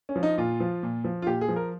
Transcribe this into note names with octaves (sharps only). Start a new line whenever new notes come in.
C#4
F3
D#4
A#2 F4
F3
A#2
F3
F4
A#2 G4
G#4
F3
A#4